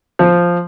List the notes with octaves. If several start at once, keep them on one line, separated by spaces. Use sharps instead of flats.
F3